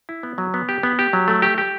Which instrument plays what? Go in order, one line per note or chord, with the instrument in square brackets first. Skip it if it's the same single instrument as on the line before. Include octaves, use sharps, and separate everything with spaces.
[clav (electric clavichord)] E4
B3
F#3
B3
G4
B3
G4
F#3
A3
G4
G4